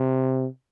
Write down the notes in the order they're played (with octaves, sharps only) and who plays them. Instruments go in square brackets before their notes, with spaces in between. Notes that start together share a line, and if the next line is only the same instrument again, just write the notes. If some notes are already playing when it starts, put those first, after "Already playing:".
Already playing: [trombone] C3